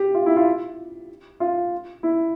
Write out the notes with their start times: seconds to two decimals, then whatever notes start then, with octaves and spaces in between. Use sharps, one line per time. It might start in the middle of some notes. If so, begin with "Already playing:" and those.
Already playing: G4
0.14 F4
0.26 E4
0.36 F4
1.40 F4
2.03 E4